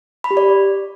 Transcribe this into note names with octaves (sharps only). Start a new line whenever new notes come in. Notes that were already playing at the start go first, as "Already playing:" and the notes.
B5
G4
D5